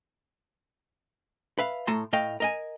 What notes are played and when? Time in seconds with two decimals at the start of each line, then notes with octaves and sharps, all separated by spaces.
1.59 B4 E5 F5
1.87 A2 A3 A5 A#5 C6
2.13 A2 A3 D#5 F5 G5
2.40 A#4 D#5 G#5